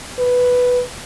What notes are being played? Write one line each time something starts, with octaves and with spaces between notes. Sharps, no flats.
B4